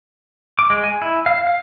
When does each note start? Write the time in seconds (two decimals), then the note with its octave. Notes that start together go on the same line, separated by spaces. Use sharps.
0.59 D6
0.70 G#3
0.84 G#5
1.02 E4
1.26 F5
1.47 F5